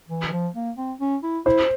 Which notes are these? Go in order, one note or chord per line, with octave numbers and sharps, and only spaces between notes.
E3
E3
F3
A#3
C4
C#4
E4
E4 C5